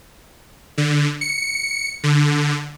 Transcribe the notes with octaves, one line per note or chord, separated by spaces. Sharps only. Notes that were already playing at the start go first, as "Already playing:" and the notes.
D3
C#7
D3